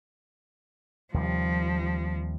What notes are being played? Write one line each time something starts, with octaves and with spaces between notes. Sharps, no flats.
D#2 C3 F3 G3